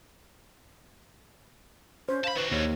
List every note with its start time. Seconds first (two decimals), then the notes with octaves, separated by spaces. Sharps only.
2.09 C#4 C5
2.24 F5 A5 B5
2.35 D#3 F#4 B4
2.52 D#2 C#5